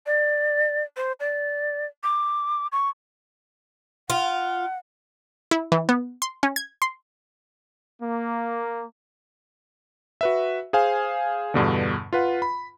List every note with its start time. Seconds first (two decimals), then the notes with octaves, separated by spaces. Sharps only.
0.06 D5
0.97 C5
1.20 D5
2.03 D6
2.72 C#6
4.10 F4 F#5
5.51 E4
5.72 E3
5.89 B3
6.22 C6
6.43 C#4
6.56 G#6
6.82 C6
8.02 A#3
10.21 F#4 B4 E5
10.73 G#4 C5 F5 G#5
11.54 E2 G2 B2 D3
12.13 F4 B4 F#5
12.42 B5